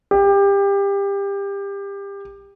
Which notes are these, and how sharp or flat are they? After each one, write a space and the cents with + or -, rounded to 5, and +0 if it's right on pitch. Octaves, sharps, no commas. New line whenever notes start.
G4 +25